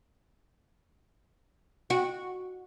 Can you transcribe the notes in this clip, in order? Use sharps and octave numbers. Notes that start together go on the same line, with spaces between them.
F#4